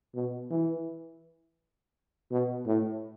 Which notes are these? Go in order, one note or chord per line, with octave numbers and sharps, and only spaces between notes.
B2
E3
B2
A2